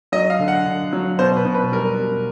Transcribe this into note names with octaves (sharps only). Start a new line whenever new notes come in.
F#3 D#5
F5
D3
F#5
D3
F#3
B2 C5
B4
B2
B4
G3 A#4
B2